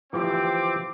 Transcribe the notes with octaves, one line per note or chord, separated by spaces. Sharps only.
E3 F3 C4 G4 D6